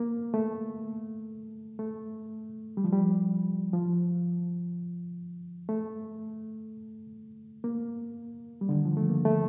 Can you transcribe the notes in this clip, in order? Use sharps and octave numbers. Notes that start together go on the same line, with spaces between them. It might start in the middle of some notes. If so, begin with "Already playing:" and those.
Already playing: A#3
A3
A3
G3
F3
G3
F3
A3
A#3
G3
D3
D#3
F3
A3
A#3
A3